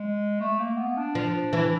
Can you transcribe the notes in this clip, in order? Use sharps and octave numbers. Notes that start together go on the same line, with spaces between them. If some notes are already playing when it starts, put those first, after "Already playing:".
Already playing: G#3
A3
A#3
B3
D4
F3
E3